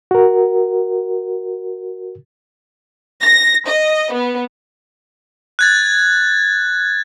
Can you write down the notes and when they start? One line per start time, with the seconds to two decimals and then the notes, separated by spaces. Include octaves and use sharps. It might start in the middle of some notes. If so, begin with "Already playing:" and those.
0.11 F#4 A#4
3.22 A#6
3.65 D#5
4.12 B3
5.59 F#6 G#6 A6